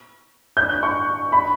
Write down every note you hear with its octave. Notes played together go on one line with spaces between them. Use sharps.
G6
F#6
C#6
B5